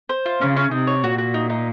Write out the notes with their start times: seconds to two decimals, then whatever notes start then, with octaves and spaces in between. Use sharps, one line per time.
0.09 C5
0.26 F4
0.41 C#3 C#4
0.57 C#4
0.71 C3 D#4
0.87 C#5
1.03 A#2 F#4
1.18 F#4
1.34 D#4
1.50 D#4